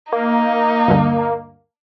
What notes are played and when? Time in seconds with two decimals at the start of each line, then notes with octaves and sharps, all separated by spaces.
0.13 A#3 D#4
0.88 D2 G2 D3